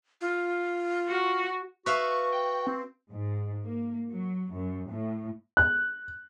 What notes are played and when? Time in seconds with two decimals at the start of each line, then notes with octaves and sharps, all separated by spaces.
0.21 F4
1.08 F#4
1.86 F#4 B4 E5 F5 C#6
2.32 G5
2.67 C4
3.10 G#2
3.62 A#3
4.11 F#3
4.53 F#2
4.91 A2
5.57 F#6